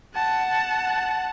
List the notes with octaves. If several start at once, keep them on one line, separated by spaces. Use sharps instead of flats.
F#5 A5